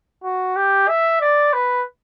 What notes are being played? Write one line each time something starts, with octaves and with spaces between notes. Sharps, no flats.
F#4
G4
E5
D5
B4